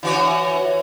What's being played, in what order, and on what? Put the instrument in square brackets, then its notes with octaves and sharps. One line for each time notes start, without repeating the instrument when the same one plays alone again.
[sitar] E3 F#4 C#5